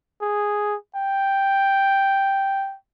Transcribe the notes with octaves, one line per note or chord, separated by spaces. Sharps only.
G#4
G5